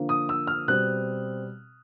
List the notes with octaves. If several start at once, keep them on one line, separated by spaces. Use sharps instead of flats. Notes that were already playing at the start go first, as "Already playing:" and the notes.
Already playing: D3 F3 A#3
D#6
E6
F6
B2 G3 C4 F#6